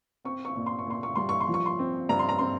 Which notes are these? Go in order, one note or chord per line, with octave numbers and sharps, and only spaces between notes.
C4 C#6
C#6
A#2
C6
C#6
A#2 C6
C#6
G3 C6
C#6
C6
F3
C#6
C6
C4
G2 A#5
C6
A#5
C4 C6